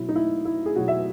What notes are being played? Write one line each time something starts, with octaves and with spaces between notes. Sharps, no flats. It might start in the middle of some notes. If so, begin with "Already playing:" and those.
Already playing: B2 F#3 E4
D#4
E4
E4
G#4
B2 F#3 F#4
E5